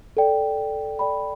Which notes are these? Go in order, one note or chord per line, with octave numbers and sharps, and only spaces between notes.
A4 D5 G5
A4 D5 G5 B5